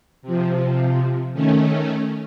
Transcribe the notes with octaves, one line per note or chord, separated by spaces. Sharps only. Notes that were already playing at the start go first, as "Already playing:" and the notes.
C3 F3
D#3 A3 C#4